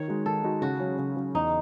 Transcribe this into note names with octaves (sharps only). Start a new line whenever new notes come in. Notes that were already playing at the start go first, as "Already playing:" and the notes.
Already playing: D#3 C#5
G#3 D#4 F#4
D#3 A4
G#3 D#4 F#4
C#3 F#4
F#3 C#4
C#3
F#3 C#4
E2 D#4